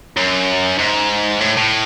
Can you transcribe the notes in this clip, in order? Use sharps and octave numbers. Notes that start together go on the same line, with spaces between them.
F#2
G#2
A2
A2